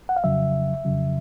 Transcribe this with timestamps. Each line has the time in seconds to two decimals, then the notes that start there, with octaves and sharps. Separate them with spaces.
0.09 F#5
0.16 F5
0.24 F2 C#3 F#3 E5
0.85 F2 C#3 F#3